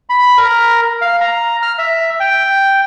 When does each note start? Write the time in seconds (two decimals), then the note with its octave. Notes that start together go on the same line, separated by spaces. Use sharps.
0.09 B5
0.38 A#4
1.02 F5
1.21 A#5
1.62 F6
1.78 E5
2.20 G5